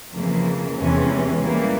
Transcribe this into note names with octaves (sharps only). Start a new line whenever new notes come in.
F2 C#3 E3 A#3
E2 C3 E3 G#3 C#4
E3 G3 A#3